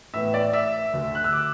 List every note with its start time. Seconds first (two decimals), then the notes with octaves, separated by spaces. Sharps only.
0.14 A2 E3 B3 E5
0.34 D5
0.53 E5
0.93 D2 D3 A3
1.15 F#6
1.24 E6
1.33 D6